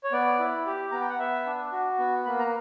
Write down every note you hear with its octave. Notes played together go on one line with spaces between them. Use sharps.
C#5
B3 D5
E4
G4
B3 A#5
G5
F#5
B3 E5
D4
F#4
B3
A#3 B5
A#5